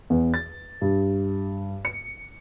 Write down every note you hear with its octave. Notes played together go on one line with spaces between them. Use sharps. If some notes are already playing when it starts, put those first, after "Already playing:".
E2
A6
G2
C#7